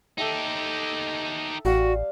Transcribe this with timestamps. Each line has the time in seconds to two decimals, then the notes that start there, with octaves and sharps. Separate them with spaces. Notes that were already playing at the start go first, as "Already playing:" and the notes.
0.18 D#4 G4 A4 E5 G5
1.65 A1 G3 F#4 F5